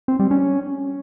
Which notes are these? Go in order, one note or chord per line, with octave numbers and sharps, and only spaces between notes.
C4
G3
C#4